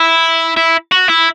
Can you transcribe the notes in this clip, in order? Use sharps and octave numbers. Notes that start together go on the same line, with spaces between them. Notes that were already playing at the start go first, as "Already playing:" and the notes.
Already playing: E4
E4
F#4
E4